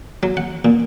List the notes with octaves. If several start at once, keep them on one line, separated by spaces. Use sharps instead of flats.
F#3
F#5
A#2